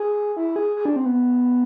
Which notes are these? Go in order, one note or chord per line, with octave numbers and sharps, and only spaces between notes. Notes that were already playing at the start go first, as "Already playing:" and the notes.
Already playing: G#4
E4
G#4
G#4
D4
C4
B3